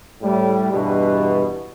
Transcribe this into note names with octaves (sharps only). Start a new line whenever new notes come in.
A2 G3
E2 G2 B2